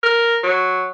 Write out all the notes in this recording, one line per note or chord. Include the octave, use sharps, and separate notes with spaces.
A#4
F#3